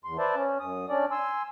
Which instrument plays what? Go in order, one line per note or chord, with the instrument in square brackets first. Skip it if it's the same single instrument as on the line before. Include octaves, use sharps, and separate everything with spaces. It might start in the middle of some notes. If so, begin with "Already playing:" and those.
[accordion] E2 C6
B4 C5 D5 E5 A5
C#4
F#2 D#6
C#4 D4 D5
G#5 C6 E6